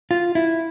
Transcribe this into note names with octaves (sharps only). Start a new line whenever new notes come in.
F4
E4